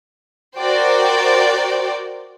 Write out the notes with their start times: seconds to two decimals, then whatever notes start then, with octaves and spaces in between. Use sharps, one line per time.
0.57 F#4 A#4 C5 D5 G5